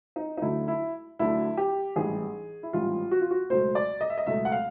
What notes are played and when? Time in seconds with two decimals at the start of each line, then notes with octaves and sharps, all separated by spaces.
0.16 D#4
0.37 D#4
0.42 D2 D3 F#3 A3 E4
0.68 E4
1.19 D2 D3 F#3 A3 E4
1.57 G4
1.96 A1 G#2 E3 G3 G#4
2.63 E4
2.73 A1 G#2 E3 G3 F4
3.11 F#4
3.21 F4
3.31 F#4
3.50 C#2 B2 F#3 A3 C5
3.75 D5
4.01 D#5
4.10 E5
4.18 D#5
4.26 C#2 B2 F#3 A3 E5
4.45 F#5
4.52 F5